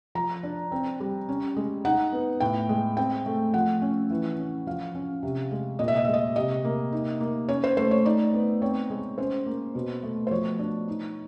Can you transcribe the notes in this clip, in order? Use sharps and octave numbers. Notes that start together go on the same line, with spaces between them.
F3 A#5
D4
C4
G3
C#4
G#3
D#4 F#5
B3
A2 G5
G#3
C4 G5
A3
F3 F#5
C#4
E3
C#4
F3 F5
C#4
C3
G#3
A#2 D#5
E5
D#5
G#3 E5
D#5
C3 D#5
A#3
D#4
A#3
C#4 C#5
C5
A3 C5
C#5
D#4 D5
B3
C4 C#5
G#3
C#4 C5
A#3
B2
A3
C5
F3 C#5
D4
D#4